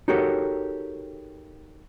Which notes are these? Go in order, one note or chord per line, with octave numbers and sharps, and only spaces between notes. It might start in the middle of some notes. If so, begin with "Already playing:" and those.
D#4 F#4 G4 A4 A#4 C#5